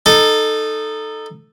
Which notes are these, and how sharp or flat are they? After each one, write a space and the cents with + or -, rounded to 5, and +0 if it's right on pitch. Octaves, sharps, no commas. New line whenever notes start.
D#4 -15 A4 +0